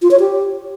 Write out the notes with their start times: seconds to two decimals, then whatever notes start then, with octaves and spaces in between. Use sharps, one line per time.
0.02 F4
0.11 C#5
0.20 G4